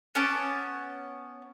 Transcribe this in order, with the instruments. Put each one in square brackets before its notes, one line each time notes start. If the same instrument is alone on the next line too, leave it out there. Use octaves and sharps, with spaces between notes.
[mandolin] B3 C#4 A5 D6